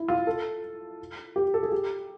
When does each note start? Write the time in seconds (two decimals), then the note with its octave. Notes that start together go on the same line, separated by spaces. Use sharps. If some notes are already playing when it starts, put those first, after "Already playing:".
Already playing: E4
0.08 F4
0.27 A4
1.36 G4
1.54 A4
1.63 G#4
1.72 G4